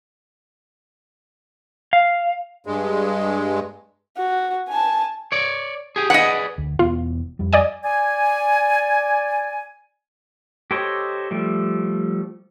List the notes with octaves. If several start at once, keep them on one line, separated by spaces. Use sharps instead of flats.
F5
G2 G#3
F#4
G#5 A5
C#5 D5
G4 G#4
G#4 B4 D5 D#5 F#5
D2
E1 E2 B3 F4
F2 G3
D5 D#5 G#5
D5 G#5
G4 A4 C5 C#5 D#5
F3 G3 A3